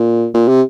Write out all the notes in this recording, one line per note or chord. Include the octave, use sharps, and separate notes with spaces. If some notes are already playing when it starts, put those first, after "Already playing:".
Already playing: A#2
A#2
C3